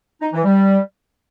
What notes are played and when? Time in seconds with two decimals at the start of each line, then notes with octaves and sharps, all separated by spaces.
0.21 D#4
0.33 E3
0.44 G3